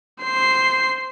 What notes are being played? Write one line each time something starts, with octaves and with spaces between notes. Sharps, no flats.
C5 C7